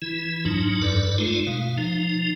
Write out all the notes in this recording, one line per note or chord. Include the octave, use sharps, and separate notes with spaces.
E3 E4
F2 G#2 F#3 D4 D#4
G2 A4 B4 D5
G#3 A3 D#4 F4
B2 F5
F3 D#4